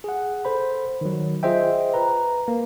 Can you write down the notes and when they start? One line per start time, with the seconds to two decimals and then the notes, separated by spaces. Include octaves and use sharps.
0.04 G#4 F#5
0.45 A4 C5 B5
1.01 D#3 F#3
1.43 F4 G#4 C5 D#5 E5 G5
1.94 B4 A#5
2.48 A#3